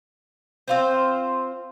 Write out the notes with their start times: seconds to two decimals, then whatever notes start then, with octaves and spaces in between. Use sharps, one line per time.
0.68 C4 F4 C5